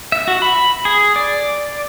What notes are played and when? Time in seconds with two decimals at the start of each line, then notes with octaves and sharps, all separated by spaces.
0.12 E5
0.28 F#4
0.42 B5
0.85 G#4
1.16 D5